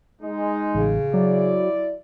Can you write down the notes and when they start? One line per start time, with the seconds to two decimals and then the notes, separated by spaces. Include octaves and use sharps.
0.22 G#3 D#4
0.74 A1 C#3
1.14 F#3 E4 D5